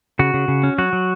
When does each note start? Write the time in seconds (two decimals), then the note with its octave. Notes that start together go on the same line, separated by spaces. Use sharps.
0.19 C#3 F#4
0.34 C#3
0.48 C#3
0.63 C#4
0.78 F#3 F#4
0.93 F#3